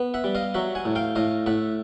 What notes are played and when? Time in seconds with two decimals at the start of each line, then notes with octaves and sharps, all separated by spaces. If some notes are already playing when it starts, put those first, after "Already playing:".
Already playing: B3
0.14 E5 F#5
0.24 G3
0.35 D#5 F5
0.54 F#3 E5 F#5
0.75 F#5 G#5
0.85 A2
0.96 F5 G5
1.15 A2 D#5 F5
1.46 A2 E5 F#5